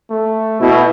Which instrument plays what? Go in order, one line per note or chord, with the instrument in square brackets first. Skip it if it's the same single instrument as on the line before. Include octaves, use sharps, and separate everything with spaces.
[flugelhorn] A3
[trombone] B2 [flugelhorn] E4